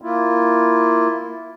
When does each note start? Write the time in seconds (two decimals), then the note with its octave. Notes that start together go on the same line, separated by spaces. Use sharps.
0.02 A#3 E4 F4